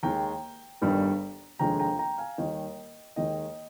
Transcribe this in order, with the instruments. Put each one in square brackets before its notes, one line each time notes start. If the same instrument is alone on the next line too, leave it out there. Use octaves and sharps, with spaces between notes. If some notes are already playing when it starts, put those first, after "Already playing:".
[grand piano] D#2 D#3 G#3 G5 A#5
G1 G2 D#3 G3
F1 D#2 D3 F3 G#3 G5 A#5
G5 A#5
G5 A#5
F5 G#5
D#2 D#3 G3 D#5 G5
D#2 D#3 G#3 D#5 G5